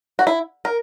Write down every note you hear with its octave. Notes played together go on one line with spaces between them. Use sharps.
F#4
E4
A#4